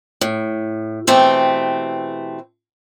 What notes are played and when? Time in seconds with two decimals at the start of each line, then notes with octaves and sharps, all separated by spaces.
0.21 A2
1.07 B2 E3 A3 C4 G4